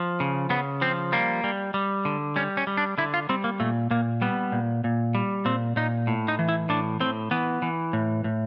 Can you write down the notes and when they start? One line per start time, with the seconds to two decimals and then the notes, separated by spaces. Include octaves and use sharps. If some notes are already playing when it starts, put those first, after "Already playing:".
Already playing: F3
0.20 C#3
0.50 C#3 B3
0.81 F3 C4
1.12 G3 A#3
1.44 G3
1.74 G3
2.05 D3
2.36 G3 C#4
2.57 C#4
2.67 G3
2.77 D4
2.98 D3 E4
3.14 F4
3.29 G3 C4
3.44 A#3
3.60 A#2 A3
3.91 A#2 A#3
4.22 G3 B3
4.52 A#2
4.84 A#2
5.15 G3
5.45 A#2 C4
5.76 A#2 D#4
6.07 A2
6.28 D#4
6.39 E3
6.49 E4
6.69 A2 D4
7.00 A2 C4
7.31 E3 B3
7.62 E3
7.93 A2
8.24 A2